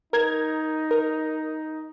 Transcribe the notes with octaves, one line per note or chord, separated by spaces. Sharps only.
D#4 A#4 G#6
A#4